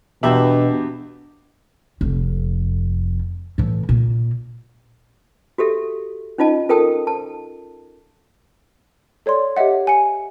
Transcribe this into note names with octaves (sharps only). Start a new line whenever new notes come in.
E2 B2 D4 G4 E5
F1 F2
A2 E3
A#2 A#3
F#4 G4 A4 E5
C#4 D#4 F4 D#5 A5
F4 A4 A#4 G5 A5 D#6
A5
A4 C#5 D5 C6
G4 C#5 D#5 E5 F#5
G#5 C#7